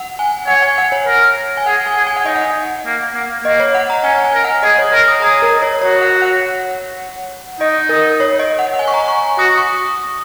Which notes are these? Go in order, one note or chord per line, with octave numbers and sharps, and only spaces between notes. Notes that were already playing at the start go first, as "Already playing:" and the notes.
Already playing: F#5
G#5
C#5 F#5
G#5
F#5
C#5
A#4
G#5
G#4 F#5
G#5
G#4
G#5
F#5
D#4 D#5
F#5
A#3
A#3
A#3 D#5
C#5
F#5
A#5
C#4 G#5
G#5
A#4
F#5
G#4 D#5
C#5
A#4 A#5
D#6
G#4 A#5
A#4
C#5
F#4 C#5
F#5
F#5
D#4 D#5
A#4
C#5
D#5
F#5
F#5
G#5
C#6
A#5
C#6
F#4 D#6
C#6